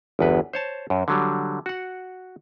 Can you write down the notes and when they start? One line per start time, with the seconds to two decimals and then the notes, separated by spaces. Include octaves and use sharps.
0.19 G1 E2 B4
0.53 C5 C#5 A5
0.90 F#2
1.08 D3 F#3 G3
1.66 F#4 F#5